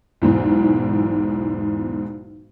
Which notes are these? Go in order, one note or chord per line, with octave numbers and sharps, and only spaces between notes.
B1 E2 G#2